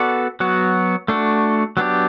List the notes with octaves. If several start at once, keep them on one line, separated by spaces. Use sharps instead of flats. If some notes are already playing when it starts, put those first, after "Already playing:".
Already playing: B3 F#4 A4 D5
F#3 B3 F#4
A3 D4 F#4
F#3 B3 D4 G4